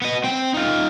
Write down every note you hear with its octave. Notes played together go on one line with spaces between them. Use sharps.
B3 D#5
C4 G5
D#4 F4